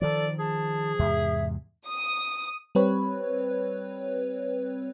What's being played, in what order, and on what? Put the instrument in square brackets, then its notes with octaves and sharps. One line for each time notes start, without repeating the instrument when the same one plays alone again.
[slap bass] D#3 F3 [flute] A4 [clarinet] D5
[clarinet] G#4 [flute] A5
[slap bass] E2 G#2 C3 [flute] E5
[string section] D#6
[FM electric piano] G3 C4 B4 C#5